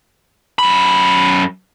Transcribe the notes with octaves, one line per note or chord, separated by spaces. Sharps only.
F#2 B5